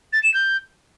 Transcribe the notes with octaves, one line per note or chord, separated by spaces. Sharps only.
A6
E7
G6